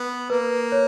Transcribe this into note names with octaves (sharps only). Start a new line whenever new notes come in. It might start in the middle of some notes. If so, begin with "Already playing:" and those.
Already playing: B3
A#3 B4
C#5